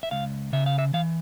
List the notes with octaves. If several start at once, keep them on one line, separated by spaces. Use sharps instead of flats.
E5
C#2 F5
C#3 E5
F5
E5
E3 F5